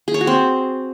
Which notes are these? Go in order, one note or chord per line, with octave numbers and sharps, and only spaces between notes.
G#4
C#5
F#4
C4